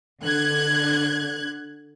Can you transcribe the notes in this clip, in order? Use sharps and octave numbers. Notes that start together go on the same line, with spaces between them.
D3 F#6 G#6